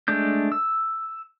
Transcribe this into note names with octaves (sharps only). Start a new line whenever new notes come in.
G#3 A3 D4 G6
E6